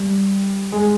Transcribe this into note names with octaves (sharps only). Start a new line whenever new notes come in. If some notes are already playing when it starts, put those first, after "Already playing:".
Already playing: G3
G#3